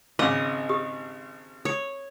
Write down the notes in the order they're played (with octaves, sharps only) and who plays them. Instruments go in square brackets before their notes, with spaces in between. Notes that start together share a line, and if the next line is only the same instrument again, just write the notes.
[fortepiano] G#1 C#3 [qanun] D#5 [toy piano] D6
[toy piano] G4 D#6
[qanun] C#5 [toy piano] D#6